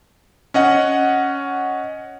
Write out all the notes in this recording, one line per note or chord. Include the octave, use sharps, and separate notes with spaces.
C#4 D#5 F#5